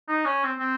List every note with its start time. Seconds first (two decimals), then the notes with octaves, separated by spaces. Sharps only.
0.08 D#4
0.25 C#4
0.43 C4
0.59 C4